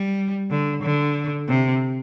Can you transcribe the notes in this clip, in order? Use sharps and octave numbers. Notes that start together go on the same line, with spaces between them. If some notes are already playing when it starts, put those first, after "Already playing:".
Already playing: G3
D3
D3
C3